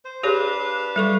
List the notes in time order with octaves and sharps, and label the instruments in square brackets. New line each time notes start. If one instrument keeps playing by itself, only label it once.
[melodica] C5
[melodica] D4 B4 F5 [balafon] G4 G#4 C#5
[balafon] G3 A4 C#6